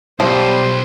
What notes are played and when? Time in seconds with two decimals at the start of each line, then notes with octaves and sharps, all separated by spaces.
0.20 B1 F3 G3 C5 C6